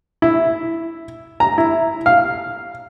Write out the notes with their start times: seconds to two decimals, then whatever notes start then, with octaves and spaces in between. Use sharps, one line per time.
0.22 E4
1.40 A#5
1.58 E4
2.06 F5